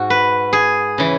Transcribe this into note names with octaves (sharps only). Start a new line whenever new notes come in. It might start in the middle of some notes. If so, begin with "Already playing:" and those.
Already playing: G#2 F#4
B4
G#4
C#3 E3